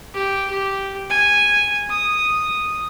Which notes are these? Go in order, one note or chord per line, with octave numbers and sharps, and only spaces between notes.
G4
G4
G#5
D#6